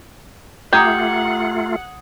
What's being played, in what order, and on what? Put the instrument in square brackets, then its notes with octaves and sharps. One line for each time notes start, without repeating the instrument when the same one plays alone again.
[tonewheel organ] A3 F4 [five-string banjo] G4 [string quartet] F#5 [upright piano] A#5 D#6 G#6